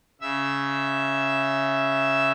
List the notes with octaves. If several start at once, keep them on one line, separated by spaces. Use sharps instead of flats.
C#3 E5 E6